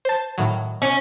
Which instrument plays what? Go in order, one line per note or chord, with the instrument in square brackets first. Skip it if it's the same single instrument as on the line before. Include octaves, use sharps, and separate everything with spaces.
[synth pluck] C5 A5
A2 D#3 F#3
[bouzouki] C#4